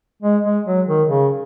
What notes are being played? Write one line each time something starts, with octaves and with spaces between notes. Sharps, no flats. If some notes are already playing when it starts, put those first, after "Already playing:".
G#3
G#3
F#3
D#3
C#3